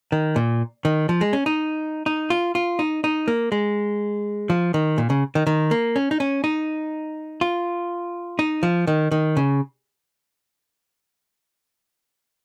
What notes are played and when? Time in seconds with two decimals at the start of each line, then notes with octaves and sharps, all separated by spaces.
0.12 D#3
0.36 A#2
0.85 D#3
1.09 F3
1.21 G#3
1.33 C#4
1.46 D#4
2.06 D#4
2.30 F4
2.55 F4
2.79 D#4
3.04 D#4
3.28 A#3
3.52 G#3
4.50 F3
4.74 D#3
4.98 A#2
5.10 C#3
5.35 D#3
5.47 D#3
5.71 A#3
5.96 C#4
6.11 D#4
6.20 C#4
6.44 D#4
7.41 F4
8.39 D#4
8.63 F3
8.87 D#3
9.11 D#3
9.37 C#3